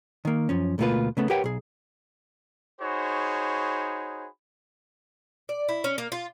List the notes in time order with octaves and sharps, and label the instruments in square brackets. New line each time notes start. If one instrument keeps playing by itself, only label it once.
[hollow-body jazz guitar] D#3 A#3
F#2 F3 C#4
D2 B2 A3 A#3 F4 B4
C#3 A3 B3
G4 A#4 B4 C#5 F#5 G5
B1 G#4
[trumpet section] D#4 F#4 G#4 C5 C#5 B5
[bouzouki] D5
E4
C#4
A#3
F4